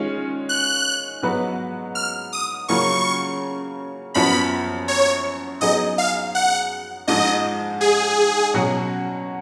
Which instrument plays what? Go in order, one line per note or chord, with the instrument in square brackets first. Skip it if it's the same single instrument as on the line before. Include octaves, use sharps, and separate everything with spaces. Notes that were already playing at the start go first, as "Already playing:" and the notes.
Already playing: [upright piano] D#3 G#3 C#4 F4
[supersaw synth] F#6
[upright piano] G#2 F#3 B3 F#4 B4
[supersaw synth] F6
D#6
[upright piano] C#3 F#3 A#3 C#4 F4 [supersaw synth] C#6
[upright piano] F#2 F3 B3 [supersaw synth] B5
[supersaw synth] C#5
[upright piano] F#3 B3 D#4 G#4 [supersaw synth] D#5
[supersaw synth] F5
F#5
[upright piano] G#2 F3 G#3 D#4 [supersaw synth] D#5
[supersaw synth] G#4
[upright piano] B2 F#3 C#4 F#4